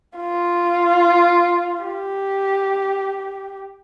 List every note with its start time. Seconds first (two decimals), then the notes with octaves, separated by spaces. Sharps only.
0.17 F4
1.83 G4